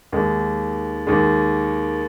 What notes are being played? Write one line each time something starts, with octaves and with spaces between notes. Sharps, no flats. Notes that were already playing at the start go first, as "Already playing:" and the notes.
D#2 D#3 G#3
D#2 D#3 G#3